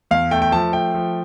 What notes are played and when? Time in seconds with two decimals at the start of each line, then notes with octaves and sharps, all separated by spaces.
0.11 E2 F5
0.31 A3 G5
0.42 G5
0.52 F3 A5
0.73 A3 G5
0.94 F3